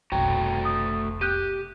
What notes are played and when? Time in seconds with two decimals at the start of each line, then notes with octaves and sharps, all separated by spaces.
0.12 F1 B1 A3 F#4 G5 A#5
0.65 D#6
1.21 G4 F#6 G6 D#7